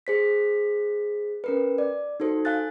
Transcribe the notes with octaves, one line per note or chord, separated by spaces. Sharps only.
G#4 C5 B6
C#4 A#4 B4
D5
D#4 F#4 A4 C5
F5 G#5 F#6 A6